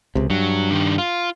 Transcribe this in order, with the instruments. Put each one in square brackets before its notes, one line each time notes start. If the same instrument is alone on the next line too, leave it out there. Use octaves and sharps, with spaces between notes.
[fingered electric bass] C#2 C3
[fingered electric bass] G2 [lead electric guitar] F#3
[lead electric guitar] D#3 D4
F4